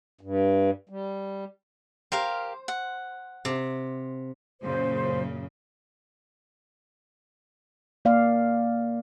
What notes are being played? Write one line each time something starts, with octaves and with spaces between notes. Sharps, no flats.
G2
G3
G4 A#4 C5 F5
F#5
C3
F#2 A#2 C#3 C5
A#3 D5 F5